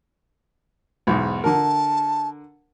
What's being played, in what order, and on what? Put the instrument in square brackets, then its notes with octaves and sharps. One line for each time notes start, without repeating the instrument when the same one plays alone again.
[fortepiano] B1 E2 G#2
[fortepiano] D3 A#4 [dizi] A5